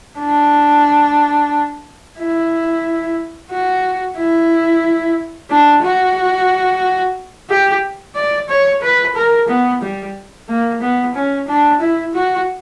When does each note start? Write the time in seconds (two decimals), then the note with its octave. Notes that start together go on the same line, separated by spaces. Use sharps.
0.19 D4
2.18 E4
3.51 F#4
4.18 E4
5.50 D4
5.83 F#4
7.49 G4
8.15 D5
8.49 C#5
8.82 B4
9.16 A#4
9.48 B3
9.81 G3
10.48 A#3
10.81 B3
11.14 C#4
11.48 D4
11.80 E4
12.14 F#4